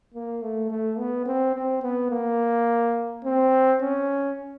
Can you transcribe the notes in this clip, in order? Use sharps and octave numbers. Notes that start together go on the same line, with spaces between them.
A#3
A3
A3
B3
C4
C4
B3
A#3
C4
C#4